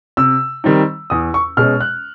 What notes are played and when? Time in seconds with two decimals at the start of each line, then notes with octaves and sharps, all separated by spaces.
0.17 C3 E6
0.64 D#3 G3 C4 D#4
1.10 E2 D#6
1.34 C#6
1.57 B2 G#3 C#4 F6
1.81 F#6